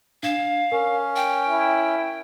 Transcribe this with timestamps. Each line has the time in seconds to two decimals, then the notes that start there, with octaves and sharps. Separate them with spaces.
0.23 D4 F5 G#6 E7
0.72 C#4 A#4
1.16 G5
1.49 E4